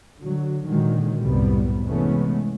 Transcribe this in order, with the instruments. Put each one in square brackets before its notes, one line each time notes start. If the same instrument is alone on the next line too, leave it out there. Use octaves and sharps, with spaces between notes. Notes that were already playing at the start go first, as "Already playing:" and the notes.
[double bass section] D3 F#3
A#2 D3 D#3 F#3 G#3
C2 F#2 A2 C3 G3 B3
C3 E3 G#3 A3 B3 C#4